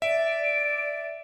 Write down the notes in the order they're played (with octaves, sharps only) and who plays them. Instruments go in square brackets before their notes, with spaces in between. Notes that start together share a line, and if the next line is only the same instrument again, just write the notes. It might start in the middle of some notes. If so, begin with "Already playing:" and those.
[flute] D5 [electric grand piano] E5 [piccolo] D7